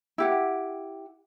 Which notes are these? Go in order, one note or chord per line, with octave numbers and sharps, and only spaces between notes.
E4 G4 F#5